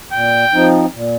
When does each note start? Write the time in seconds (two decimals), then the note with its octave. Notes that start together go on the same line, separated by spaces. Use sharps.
0.12 A#2 G5
0.53 F3 C4 D#4
0.93 A#2